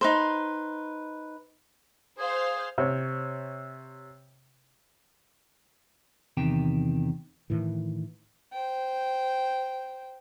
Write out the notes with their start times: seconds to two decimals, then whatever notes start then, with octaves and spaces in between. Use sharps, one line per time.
0.01 D#4 B4 C5
2.19 G#4 C5 F5
2.78 C3 C#5
6.37 E2 C3 D#3 G4 G5
7.50 A2 D#3 E3
8.52 C5 G5